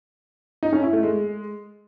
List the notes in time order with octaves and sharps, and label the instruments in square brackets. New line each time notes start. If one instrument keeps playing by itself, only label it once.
[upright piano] D#4
C#4
E4
A3
G#3